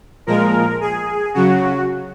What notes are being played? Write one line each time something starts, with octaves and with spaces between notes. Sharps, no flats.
A#2 F3 G#3 A#4
G#4
C#3 F#3 F#4